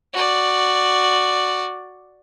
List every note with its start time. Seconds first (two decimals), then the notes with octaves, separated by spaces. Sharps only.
0.13 F#4 D5